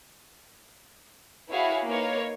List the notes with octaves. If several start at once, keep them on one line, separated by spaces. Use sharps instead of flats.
E4 F#4 G#4 B4 C#5 F5
A#3 D#4 A#4 B4 C#5 F5